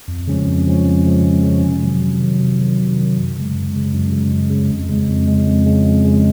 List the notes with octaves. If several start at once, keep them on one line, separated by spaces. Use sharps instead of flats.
F2
C#3 F3 G#3 C#4
F2
C#3 F3 G#3 C#4
F2
C#3 F3 G#3 C#4
F2
C#3 F3 G#3 C#4
C3
D#3 F#3
C3
D#3 F#3
C3
D#3 F#3
C3
D#3 F#3
F#2
C#3 G#3
F#2
C#3 G#3
F#2
C#3 G#3
F#2
C#3 G#3
F2
C#3 G#3
F2
C#3 G#3
F2
C#3 G#3
F2
C#3 G#3